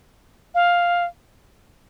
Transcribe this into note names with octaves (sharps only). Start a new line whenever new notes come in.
F5